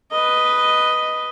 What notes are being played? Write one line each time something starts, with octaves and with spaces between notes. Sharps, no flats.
B4 D#5